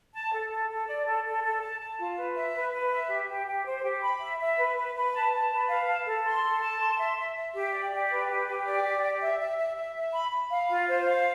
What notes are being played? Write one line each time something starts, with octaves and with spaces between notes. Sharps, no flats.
A5
A4
A4
A4
D5
A4
A4
A4
A5
A5
F4
B4
E5
B4
B4
E5
G4
G4
G4
C5
G4
B5
E5
E5
B4
B4
B4
A5
A5
B4
F5
A5
A4
C6
A4
A5
C6
E5
E5
E5
G4
D5
G4
B4
G4
G4
D5
G4
G4
E5
E5
E5
E5
E5
B5
B5
F5
F4
C5
F5